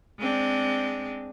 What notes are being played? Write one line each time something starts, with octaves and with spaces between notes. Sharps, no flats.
G#3 C4 D4